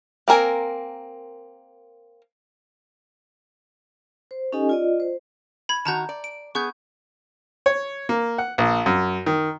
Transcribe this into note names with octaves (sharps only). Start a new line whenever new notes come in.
A#3 C4 A#4 G#5
C5
C#4 D#4 G4 A4 D#5 G#5
F4 D5 D#5
C5
B5 G#6
D#3 F#4 A5 A#5 G6
D5
D7
B3 G#4 C#6 G6
C#5
A#3
F#5
A#1
F#2
D#3